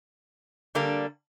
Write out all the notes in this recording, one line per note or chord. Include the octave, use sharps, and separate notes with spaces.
D3 G3 A#3 D4